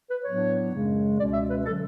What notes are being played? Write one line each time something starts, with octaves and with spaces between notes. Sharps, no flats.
B4
A2 F#3 B3 D4 C#5
F#2 C#3 G#3
C#2 B2 G#3 C#4 D5
E5
B4
D3 F#3 A4